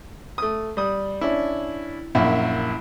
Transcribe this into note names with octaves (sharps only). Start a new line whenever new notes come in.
A3 D#6
G3 D#6
C#4 D4 E4
A#1 F#2 E4 E5